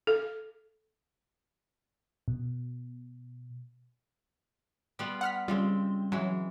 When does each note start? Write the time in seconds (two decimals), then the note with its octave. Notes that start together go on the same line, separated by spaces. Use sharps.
0.07 A4
2.28 B2
4.99 G3 B3 F4
5.21 F#5 F6 B6
5.48 C#3 G3 G#3 C4 F4
6.12 E3 F#3 G#3